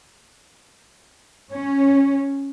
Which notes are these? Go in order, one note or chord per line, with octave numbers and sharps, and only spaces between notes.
C#4